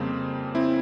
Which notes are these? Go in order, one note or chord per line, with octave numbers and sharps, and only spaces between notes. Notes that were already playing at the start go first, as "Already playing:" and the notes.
Already playing: F2 C#3 G3 A#3 C4
C4 E4